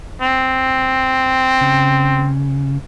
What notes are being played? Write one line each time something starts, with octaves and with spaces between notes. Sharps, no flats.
C4
C#3